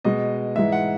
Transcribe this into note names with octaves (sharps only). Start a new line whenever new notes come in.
B2 G#3 D#5
G#2 E3 G#3 E5
F#5